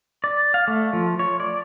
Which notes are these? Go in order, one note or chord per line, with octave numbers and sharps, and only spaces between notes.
D5
F5
A3
F3
C#5
D5